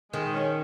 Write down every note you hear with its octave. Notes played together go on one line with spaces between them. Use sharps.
D#3 G#3
C#4